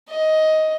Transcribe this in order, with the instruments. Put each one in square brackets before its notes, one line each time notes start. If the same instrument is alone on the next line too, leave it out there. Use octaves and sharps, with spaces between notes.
[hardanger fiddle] D#5